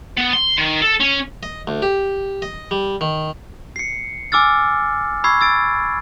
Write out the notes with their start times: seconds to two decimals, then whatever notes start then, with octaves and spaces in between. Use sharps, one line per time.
0.17 B3
0.33 C6
0.58 D#3
0.82 A4
1.01 C#4
1.43 D#5
1.67 D2
1.82 G4
2.42 D#5
2.71 G3
3.01 D#3
3.76 C7 C#7
4.32 G#5 D6 E6 F6 A6
5.24 B5 C#6 E6 G#6 C7
5.41 E6 A6 D7